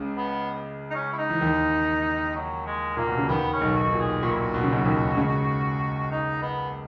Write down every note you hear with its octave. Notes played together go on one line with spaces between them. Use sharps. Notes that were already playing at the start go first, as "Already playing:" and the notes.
Already playing: C#2 C#3
B3
D#4
C#4
E4
D#4
E3
D#2 D#3
F#3
G#3
A#2 A#3
B2
C#3
D#2 D#3 B3
C#4
B1 B2
F#4
A#2
G#4
A#2 F#4
E4
F#4
B2
C#3
B1 B2
D#2 D#3
C#2 C#3
D#4
B3